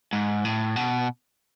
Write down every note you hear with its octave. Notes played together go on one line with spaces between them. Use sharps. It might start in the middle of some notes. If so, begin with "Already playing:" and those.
G#2
A2
B2